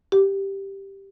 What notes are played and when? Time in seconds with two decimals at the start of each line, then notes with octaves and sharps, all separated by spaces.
0.12 G4